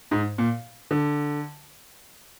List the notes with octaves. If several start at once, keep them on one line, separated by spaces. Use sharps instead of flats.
G#2
A#2
D3